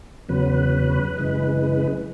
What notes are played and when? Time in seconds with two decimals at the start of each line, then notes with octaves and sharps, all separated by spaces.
0.29 E2 C#3 F#3 B4
1.17 F#2 C#3 E3 G#3